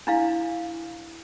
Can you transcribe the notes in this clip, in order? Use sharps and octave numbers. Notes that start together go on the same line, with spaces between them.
D4 E4 F5